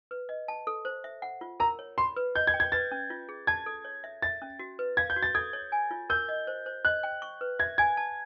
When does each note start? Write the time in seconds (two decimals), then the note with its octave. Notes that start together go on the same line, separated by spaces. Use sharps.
0.11 B4
0.29 D#5
0.48 A5
0.67 A4
0.85 C5
1.04 E5
1.22 F#5
1.41 F4
1.60 A#4 A#5
1.79 C#5
1.98 B5 C6
2.16 B4
2.35 D#5 G6
2.47 G#6
2.54 G5
2.60 G#6
2.72 B4 A6
2.91 C#4
3.10 F4
3.29 G#4
3.47 A5 G#6
3.66 A4
3.85 C#5
4.04 E5
4.22 E5 A6
4.42 C#4
4.59 F#4
4.79 B4
4.97 F5 G#6
5.10 G6
5.16 F#4
5.23 A6
5.35 A4 G#6
5.53 C#5
5.72 G#5
5.91 F4
6.10 A#4 G6
6.29 D#5
6.47 C5
6.66 C5
6.85 D#5 F#6
7.03 G5
7.22 C#6
7.41 B4
7.59 E5 G#6
7.78 G#5 G#6
7.97 A5